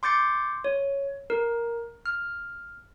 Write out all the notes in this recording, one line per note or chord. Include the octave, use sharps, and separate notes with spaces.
C6 D6 G6 A6 C#7
C#5
A#4
F6